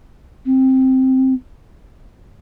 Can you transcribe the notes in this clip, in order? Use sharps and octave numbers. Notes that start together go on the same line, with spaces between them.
C4